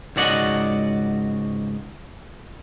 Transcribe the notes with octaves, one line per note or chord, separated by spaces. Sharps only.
C#2 G#2 F#4 D5 D#5 F#5